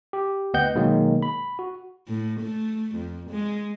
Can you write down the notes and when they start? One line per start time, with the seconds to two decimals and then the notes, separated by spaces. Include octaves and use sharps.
0.13 G4
0.54 D2 B3 D#5 F#5 G5 G6
0.75 B2 D#3 F#3 G#3 A#3
1.23 B5
1.59 F#4
2.08 A2
2.41 A3
2.96 F2
3.30 G#3